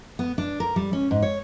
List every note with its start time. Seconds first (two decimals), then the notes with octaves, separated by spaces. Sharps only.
0.19 B3
0.38 D4
0.60 A#4
0.76 G3
0.93 C#4
1.11 G#2
1.22 C#5